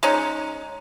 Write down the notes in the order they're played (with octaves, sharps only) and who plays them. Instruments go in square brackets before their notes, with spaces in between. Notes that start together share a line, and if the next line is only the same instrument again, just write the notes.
[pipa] G#3 C#4 D#4